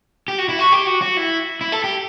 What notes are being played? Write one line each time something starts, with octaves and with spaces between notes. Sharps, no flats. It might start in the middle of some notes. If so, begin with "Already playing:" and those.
G4
F#4
E4
F#4
G4
F#4
F#4
E4
E4
A4
G4